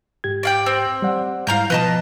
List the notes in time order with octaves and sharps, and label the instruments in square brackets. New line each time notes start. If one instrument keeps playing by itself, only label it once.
[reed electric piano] G#2 G4 G#6
[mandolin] D5 F5 G5
C4
[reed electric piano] G3 D5 F#5
[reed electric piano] G#2 E4 [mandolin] F5 A#5 G6
[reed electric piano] B2 F3 [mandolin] B4 D#5 A5